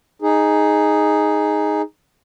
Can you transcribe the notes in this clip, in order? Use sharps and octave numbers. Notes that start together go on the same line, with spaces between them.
D#4 G#4